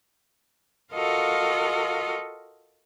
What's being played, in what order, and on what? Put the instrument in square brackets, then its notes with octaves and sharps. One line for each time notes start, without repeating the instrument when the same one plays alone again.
[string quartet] F4 F#4 A4 A#4 D#5 F5